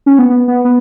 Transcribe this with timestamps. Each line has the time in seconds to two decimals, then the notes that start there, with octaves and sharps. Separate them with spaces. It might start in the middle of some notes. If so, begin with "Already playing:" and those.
0.06 C#4
0.19 B3
0.30 B3
0.48 B3
0.65 B3